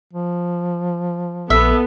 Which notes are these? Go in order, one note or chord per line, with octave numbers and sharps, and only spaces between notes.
F3
A#1 B3 A4 E5